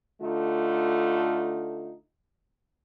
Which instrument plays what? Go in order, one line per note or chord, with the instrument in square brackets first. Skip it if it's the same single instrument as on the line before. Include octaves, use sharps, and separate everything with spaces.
[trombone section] D3 A3 D#4 F4